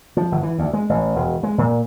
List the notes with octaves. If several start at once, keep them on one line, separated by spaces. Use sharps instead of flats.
F3
G1
E3
D2
G#3
A1
E1
G#3
A#2